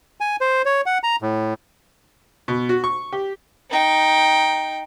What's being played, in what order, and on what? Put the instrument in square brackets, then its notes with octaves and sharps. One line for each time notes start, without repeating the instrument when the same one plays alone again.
[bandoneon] G#5
C5
C#5
F#5
A#5
A2
[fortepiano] B2
F#4
C#6
G4
[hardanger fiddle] D#4 G5